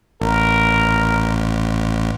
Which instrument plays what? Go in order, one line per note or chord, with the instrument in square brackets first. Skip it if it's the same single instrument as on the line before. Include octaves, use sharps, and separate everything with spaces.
[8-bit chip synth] A1 [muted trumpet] A#4